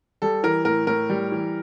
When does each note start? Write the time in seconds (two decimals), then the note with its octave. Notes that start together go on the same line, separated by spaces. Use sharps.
0.22 G3 A4
0.43 E3 A#4
0.65 A2 A#4
0.87 A2 A#4
1.10 G3
1.32 E3